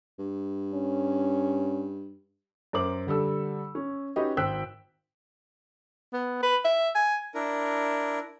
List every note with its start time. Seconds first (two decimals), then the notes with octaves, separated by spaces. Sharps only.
0.18 G2
0.73 C#4
2.73 F#2 A#4 C5 D6 F#7
3.07 D3 G3 A4 E6
3.75 C#4
4.16 C#4 D#4 F#4 G4 B4 D#5
4.37 G#1 C5 G5 E6 F#6 B6
6.13 B3
6.43 B4
6.65 E5
6.95 G#5
7.34 D4 E4 A#4